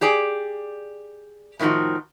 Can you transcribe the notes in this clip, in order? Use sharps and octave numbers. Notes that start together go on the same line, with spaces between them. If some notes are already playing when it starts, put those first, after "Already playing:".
G4 G#4 D5
A2 D#3 F3 D#4 F#4